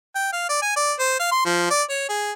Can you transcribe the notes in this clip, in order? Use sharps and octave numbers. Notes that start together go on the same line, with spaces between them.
G5
F5
D5
G#5
D5
C5
F5
C6
F3
D5
C#5
G#4